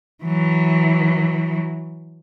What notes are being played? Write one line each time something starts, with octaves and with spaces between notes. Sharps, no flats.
E3 F#3